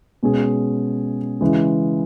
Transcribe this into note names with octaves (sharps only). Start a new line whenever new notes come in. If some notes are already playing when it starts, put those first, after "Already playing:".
B2 G#3 C#4 G#4
C#3 E3 G#3